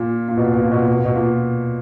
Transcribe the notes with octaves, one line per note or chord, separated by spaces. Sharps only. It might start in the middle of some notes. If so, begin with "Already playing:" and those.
Already playing: A#2
A#2
B2
A#2
B2
A#2
B2
A#2
B2
A#2
B2
A#2